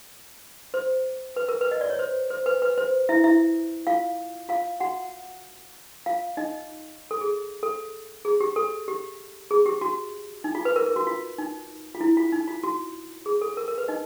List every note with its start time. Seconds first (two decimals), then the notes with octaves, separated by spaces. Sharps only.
0.74 C5
1.36 B4
1.49 A#4
1.61 B4
1.71 D#5
1.81 D5
1.90 C#5
1.99 C5
2.30 C5
2.46 B4
2.62 B4
2.78 C5
3.09 E4 E5
3.24 E4 E5
3.87 F4 F5
4.49 F4 F5
4.80 F#4 F#5
6.06 F4 F5
6.37 D#4 D#5
7.11 A4
7.21 G#4
7.63 A4
8.25 G#4
8.40 G4
8.56 A4
8.88 G4
9.51 G#4
9.66 G4
9.81 F#4
10.44 D#4
10.55 F4
10.65 B4
10.76 A#4
10.86 A#4
10.96 F#4
11.07 F4
11.38 D#4
11.95 F4
12.01 E4
12.17 F4
12.32 D#4
12.48 F4
12.64 F#4
13.26 G#4
13.41 A4
13.57 A#4
13.68 A#4
13.78 B4
13.88 D#4 D#5